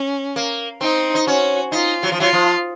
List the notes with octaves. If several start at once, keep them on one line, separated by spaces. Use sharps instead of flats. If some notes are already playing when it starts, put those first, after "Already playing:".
Already playing: C#4
A#3
C4 D#4
D#4
C#4 F#4
D#4 F4
F#3
F3
F#3 F4
F3